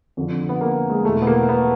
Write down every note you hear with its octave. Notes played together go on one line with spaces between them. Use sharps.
F2 D3 F3
B3
A#3
G#3
E2 B2 A3
B3
A#3
B3